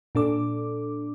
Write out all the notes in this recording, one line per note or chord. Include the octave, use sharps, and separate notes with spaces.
A#2 D4 A4 D6